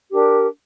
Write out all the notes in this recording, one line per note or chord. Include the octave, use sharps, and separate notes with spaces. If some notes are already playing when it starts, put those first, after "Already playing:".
D4 G4 A#4